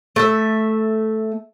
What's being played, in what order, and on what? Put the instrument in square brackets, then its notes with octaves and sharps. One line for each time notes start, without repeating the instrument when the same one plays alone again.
[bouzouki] A3 E5